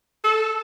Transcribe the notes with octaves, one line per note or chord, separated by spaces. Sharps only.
A4